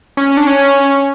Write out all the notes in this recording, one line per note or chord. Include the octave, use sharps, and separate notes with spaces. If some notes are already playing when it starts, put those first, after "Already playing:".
C#4
D4
C#4